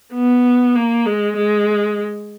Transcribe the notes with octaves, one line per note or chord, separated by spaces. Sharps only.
B3
A#3
G#3
G#3